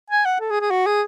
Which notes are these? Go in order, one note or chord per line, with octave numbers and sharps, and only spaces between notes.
G#5
F#5
A4
G#4
G#4
F#4
G#4